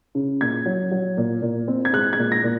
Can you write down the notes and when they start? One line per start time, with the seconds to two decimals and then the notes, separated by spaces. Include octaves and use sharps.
0.15 C#3
0.41 A#2 G#6
0.66 F#3
0.91 F#3
1.17 A#2
1.42 A#2
1.68 C4
1.85 G#6
1.93 G#3 F#6
2.13 G#6
2.18 A#2
2.32 A#6
2.43 A#2